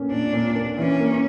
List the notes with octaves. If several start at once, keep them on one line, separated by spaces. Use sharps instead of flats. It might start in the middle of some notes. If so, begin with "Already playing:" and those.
Already playing: A#2 A#3 C#4
A#2 D4
A#2
A#3
E3 C#4
A#3